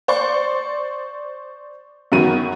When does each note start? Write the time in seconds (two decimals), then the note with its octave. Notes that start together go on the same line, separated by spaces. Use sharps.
0.08 C5 D5 C#6
2.12 F#2 D#3 F#3 B3 D#7